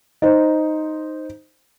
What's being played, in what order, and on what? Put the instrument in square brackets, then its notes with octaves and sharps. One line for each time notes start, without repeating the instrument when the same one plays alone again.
[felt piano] D#4 C5